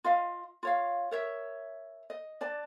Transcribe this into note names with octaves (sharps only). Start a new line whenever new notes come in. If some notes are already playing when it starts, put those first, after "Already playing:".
F4 D#5 F5
F4 C#5 F5
A#4 C#5 E5
D#5
D4 D5 A5